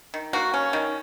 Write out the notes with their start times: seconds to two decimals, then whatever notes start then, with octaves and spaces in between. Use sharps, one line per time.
0.14 D#3
0.33 A#3 F#4
0.54 C#4
0.73 D#3